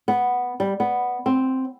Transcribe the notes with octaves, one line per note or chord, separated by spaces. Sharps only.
B3
G3
B3
C4